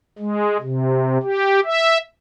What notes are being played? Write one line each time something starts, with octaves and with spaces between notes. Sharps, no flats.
G#3
C3
G4
E5